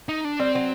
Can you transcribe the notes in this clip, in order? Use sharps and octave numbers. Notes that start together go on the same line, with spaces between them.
D#4
D4
G3 C4
F#3